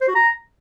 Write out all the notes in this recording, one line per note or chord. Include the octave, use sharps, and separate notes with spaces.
C5
F#4
A#5